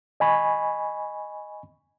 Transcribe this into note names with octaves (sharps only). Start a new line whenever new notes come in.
D#5 G#5 B5 C#6